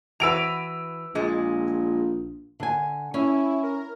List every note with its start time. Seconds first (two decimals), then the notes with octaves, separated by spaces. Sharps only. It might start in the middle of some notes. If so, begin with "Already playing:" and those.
0.20 E3 F#4 B4 E6 D7 F7
1.15 A#1 A#2 G#3
2.60 D3 G#5
3.14 C#4 E4
3.63 A#4